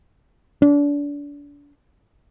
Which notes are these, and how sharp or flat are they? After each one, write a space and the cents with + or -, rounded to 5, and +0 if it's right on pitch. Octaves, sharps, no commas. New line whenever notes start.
D4 -30